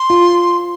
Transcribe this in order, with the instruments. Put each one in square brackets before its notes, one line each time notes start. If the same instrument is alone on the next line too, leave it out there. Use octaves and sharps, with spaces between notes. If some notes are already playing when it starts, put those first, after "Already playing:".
Already playing: [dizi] C6
[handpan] F4